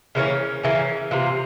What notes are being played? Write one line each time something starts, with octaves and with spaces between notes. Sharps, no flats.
C#3 E3 A#3 C#4
C#3 E3 A#3 C#4
C3 E3 A#3 F4